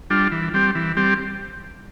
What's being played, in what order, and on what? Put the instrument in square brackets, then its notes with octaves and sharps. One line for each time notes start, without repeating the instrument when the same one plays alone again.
[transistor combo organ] G3 D4 F4
E3
G3 C4 G4
E3
G3 C4 G4